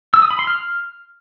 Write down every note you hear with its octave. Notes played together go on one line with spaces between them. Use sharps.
E6
D#6
B5
C6
F6